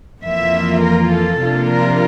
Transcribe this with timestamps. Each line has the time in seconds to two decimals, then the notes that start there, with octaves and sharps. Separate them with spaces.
0.23 F2 E3 A#3 F4 E5
0.82 A#4
1.11 A4
1.41 C3 F3 A#3 D4 F4
1.70 A#4